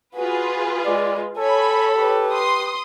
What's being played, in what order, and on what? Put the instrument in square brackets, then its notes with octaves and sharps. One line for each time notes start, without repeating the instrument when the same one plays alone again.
[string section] F4 G#4 B4 [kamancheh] F#4
[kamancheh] G#3 [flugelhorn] D5
[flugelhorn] A4 [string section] C#5 B5 [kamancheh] G#5
[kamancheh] G4 B4
[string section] C6 D#6